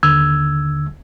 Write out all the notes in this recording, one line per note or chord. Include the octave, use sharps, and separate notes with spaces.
D#2 D3 E6 G#6